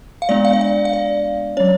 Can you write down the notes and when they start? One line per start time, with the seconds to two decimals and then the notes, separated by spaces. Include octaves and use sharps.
0.22 F5
0.29 G#3 B3 D4 D5
0.45 F5
0.53 D5
0.61 F5
0.85 F5
0.93 D5
1.57 F#3 C#4 C#5